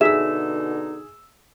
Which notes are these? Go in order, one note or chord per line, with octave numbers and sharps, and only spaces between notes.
B2 D3 D#4 G#4 E5 E6 E7